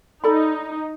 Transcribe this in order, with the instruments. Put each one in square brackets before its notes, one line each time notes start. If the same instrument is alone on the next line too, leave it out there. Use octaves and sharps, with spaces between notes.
[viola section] D#4 [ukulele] A4 D5 B5